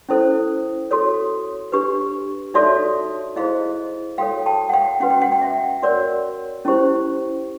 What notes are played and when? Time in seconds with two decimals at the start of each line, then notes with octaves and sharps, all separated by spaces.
0.09 C#4 E4 A4 C5
0.91 F#4 A4 C#5
1.72 D4 G4 B4
2.54 D#4 F#4 A4 C#5 D5 E5
3.36 E4 G#4 C5 D#5 F5
4.18 F#4 A4 C#5 F5 G5
4.46 G5 A5
4.69 F#5
4.73 F5 G5
5.00 C#4 F#4 B4 F#5
5.10 G5
5.22 F#5
5.32 G5
5.41 E5 F#5
5.83 F#4 A#4 C#5 D5
6.65 C#4 E4 G4 C5